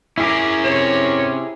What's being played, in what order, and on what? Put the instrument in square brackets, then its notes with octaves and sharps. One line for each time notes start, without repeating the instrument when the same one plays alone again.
[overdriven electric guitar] C#4 A#4 [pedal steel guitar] E4 G#4 D6
[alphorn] C3 [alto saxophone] C#5